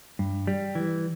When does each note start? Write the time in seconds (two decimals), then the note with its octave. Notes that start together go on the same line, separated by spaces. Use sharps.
0.19 G2
0.47 G3
0.75 E3